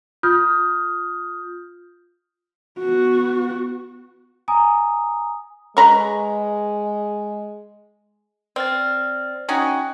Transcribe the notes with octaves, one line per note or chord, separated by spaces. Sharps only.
F4 D#6 F6 G6
B3 F#4
G#5 A#5 D#6
G#3 B4 A#5 C#6
C4 D5 F6 A6
C#4 D#4 F#4 G5